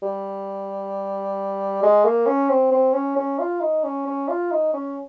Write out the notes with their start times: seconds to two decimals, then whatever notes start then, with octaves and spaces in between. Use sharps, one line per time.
0.02 G3
1.83 G#3
2.05 A#3
2.26 C#4
2.50 C4
2.71 C4
2.93 C#4
3.16 C#4
3.39 F4
3.61 D#4
3.84 C#4
4.07 C#4
4.28 F4
4.51 D#4
4.74 C#4